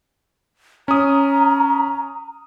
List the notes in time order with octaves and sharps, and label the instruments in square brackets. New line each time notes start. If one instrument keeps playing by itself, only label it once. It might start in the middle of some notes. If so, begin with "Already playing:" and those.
[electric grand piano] C#4 D#6 [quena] A#5